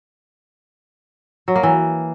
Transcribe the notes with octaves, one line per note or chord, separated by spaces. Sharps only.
F#3
A#3
E3